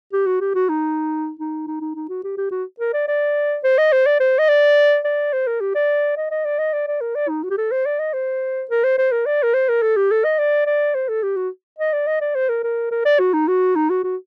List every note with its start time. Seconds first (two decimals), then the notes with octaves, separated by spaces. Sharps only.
0.13 G4
0.26 F#4
0.41 G4
0.55 F#4
0.69 D#4
1.39 D#4
1.67 D#4
1.81 D#4
1.95 D#4
2.09 F#4
2.23 G4
2.37 G4
2.51 F#4
2.80 A#4
2.94 D5
3.08 D5
3.64 C5
3.78 D#5
3.92 C5
4.06 D5
4.20 C5
4.39 D#5
4.49 D5
5.05 D5
5.33 C5
5.47 A#4
5.61 G4
5.75 D5
6.17 D#5
6.31 D#5
6.45 D5
6.59 D#5
6.73 D5
6.87 D5
7.01 A#4
7.15 D5
7.29 D#4
7.44 F#4
7.50 G4
7.58 A4
7.72 C5
7.86 D5
7.99 D#5
8.13 C5
8.70 A#4
8.84 C5
8.98 C5
9.12 A#4
9.26 D5
9.43 A#4
9.54 C5
9.69 A#4
9.82 A4
9.96 G4
10.11 A4
10.24 D#5
10.39 D5
10.66 D5
10.95 C5
11.09 A4
11.23 G4
11.36 F#4
11.78 D#5
11.93 D5
12.07 D#5
12.21 D5
12.35 C5
12.49 A#4
12.64 A#4
12.91 A#4
13.05 D5
13.19 F#4
13.34 D#4
13.48 F#4
13.76 D#4
13.90 F#4
14.04 F#4